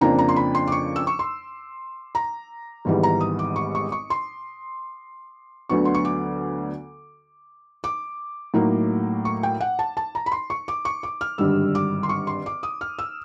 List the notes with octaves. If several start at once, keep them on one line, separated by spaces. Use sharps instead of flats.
F2 C#3 F3 A#3 D4 A#5
A#5
C6
B5
C6
D6
C#6
E6
C#6
C6
A#5
G#1 G#2 E3 G3 B3
A#5
D#6
D6
C#6
C#6
C#6
C6
D2 D3 F#3 B3 C#6
C6
C#6
D6
D6
A2 F#3 A#3 D#4
C#6
G5
F#5
A5
A5
A#5
B5
C6
C#6
D6
C#6
D6
F6
G#1 G2 D3 G3 E6
D6
C6
C#6
C6
D6
D#6
F6
E6